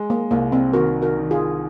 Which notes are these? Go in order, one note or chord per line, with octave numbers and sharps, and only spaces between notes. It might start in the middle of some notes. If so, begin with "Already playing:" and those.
Already playing: G#3
A#3
C2 A#3
C4
D#3 F#4 A#4
F#4 A#4
D#3
F4 G#4